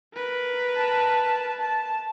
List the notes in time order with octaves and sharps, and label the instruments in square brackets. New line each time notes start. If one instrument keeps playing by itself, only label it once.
[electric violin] A#4 B4
[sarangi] A5
A5